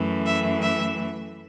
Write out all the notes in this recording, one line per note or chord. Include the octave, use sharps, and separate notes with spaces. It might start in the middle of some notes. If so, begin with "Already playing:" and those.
Already playing: F#2 E3 A3
E5
E5